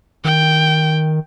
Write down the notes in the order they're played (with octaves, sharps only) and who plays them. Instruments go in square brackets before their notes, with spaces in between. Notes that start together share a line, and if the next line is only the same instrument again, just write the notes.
[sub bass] D#3 [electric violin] G5